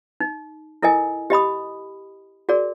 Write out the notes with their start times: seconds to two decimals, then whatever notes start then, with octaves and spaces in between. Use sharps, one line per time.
0.20 D#4
0.82 E4 A4 A#4 D#5 G#5
1.30 G4 D#5 B5 D#6
2.49 F#4 G#4 A#4 D5